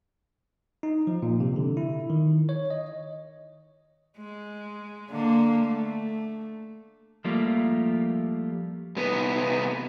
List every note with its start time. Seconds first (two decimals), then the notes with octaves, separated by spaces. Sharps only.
0.83 D#4
1.07 F3
1.22 A#2
1.40 C3
1.56 D3
1.77 E4
2.10 D#3
2.49 C#5
2.70 D#5
4.18 G#3
5.10 D3 A#3
5.66 A3
7.24 F3 G3 A3 A#3 F4
8.96 C2 B3